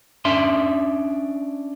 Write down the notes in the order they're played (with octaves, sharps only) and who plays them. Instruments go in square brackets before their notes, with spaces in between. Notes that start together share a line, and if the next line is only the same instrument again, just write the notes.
[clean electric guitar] C#4 D4 E5 C6